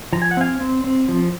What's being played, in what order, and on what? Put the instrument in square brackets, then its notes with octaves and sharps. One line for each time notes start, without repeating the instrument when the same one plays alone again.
[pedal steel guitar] F3 A#5
G#5
F#5
C4 F5 G#5
C4
C4
F3